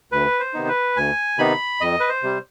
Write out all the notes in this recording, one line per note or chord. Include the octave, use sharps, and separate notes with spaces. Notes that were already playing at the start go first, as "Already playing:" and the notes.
D2 B4
C5
C3 D#3 B3 D#4
B4
D2 G#5
C3 D#3 B3 D#4 B5
F2 D#5
B4
C5
C3 G3